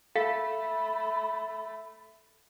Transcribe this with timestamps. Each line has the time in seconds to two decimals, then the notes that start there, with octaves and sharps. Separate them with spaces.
0.16 A3 A4 F5 B5